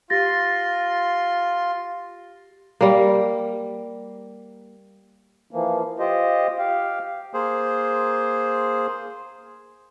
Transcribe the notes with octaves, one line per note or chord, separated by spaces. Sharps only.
F4 G4 C6 A6 A#6
G3 A#3
E3 F3 A#3
F4 G4 C5 D#5
G4 F5
A#3 G#4 C5